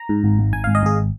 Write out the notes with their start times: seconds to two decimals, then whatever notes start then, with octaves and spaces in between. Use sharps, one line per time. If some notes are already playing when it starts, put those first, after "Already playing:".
Already playing: A#5
0.09 G#2
0.24 G#1
0.39 G#1
0.53 G#1 G#5
0.64 G#1 F5
0.75 D#5
0.83 G#1 G#4